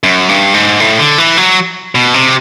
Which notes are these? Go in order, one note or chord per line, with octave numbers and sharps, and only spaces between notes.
F#2
G2
G#2
A2
D3
E3
F#3
B2
C3